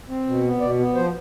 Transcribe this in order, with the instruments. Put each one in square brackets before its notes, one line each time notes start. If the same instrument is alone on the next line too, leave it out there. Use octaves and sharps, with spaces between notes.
[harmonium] C4
B2
B3
B2 D5
B3
F3 C5